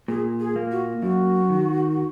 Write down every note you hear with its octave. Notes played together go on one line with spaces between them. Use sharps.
A#2 G#4
G#4
A#3
F#4
F#2 F#4
D#3